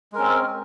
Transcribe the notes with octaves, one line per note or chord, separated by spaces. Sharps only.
G#3 C4 C#4 A#4